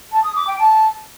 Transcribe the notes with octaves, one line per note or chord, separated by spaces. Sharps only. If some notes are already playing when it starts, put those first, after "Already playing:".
A5
D#6
D6
G5
A5